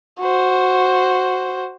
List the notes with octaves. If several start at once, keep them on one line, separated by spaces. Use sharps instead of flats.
F#4 C5